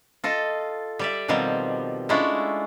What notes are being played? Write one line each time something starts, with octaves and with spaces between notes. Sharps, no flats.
F4 A4 D#5
G3 D5 E5
B2 D#3 F3 G3 C4
G#3 A3 C#4 D4 E4 F4